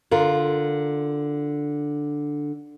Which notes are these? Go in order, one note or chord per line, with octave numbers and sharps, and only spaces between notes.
D3 F4 A#4